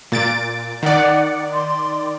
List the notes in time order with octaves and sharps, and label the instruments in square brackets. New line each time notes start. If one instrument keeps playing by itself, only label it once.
[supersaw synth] A#2 A6 D7
[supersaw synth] D#3 D5 [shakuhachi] F#5
[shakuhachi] C6